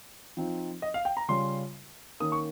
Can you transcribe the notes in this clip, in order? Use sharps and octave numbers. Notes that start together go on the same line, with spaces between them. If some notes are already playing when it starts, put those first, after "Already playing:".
F3 C4 D#4
D#5
F5
G5
A#5
C#3 G3 C#4 F4 C6
D#3 A#3 C#4 D#6
C#6